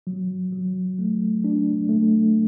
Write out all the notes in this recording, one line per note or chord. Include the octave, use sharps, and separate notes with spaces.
F#3
F#3
A3
D4
A3